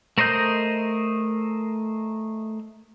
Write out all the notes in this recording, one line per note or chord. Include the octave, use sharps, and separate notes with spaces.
A3 A#4 C5 D#5 G6